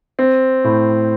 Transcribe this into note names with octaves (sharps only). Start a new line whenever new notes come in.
C4
A2